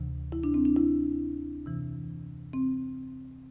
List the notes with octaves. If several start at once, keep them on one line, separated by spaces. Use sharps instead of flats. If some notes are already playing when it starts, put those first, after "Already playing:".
Already playing: D2 C3 E3
E4
D4
C4
D4
E4
F2 C3 E3
C4